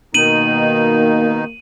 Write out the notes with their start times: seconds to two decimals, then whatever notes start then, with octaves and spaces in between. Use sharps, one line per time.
0.14 B2 D#3 A#3 D#4 D#7 F#7